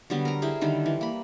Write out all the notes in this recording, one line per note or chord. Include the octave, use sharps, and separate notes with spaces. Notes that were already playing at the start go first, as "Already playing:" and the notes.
D3 F#3 G3 B3
A#4 A#5
E4 G4 G#4 C5
D3 D#3 G3 A4
E3
A#3 B5